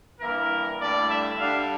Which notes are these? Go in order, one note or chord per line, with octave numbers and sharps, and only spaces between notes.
G2 E3 A#3 E4 A#4
G2 D3 A3 E4 D5
E5
D3 G3 D4 F5